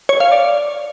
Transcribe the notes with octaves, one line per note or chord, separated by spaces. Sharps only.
C#5
F5
D5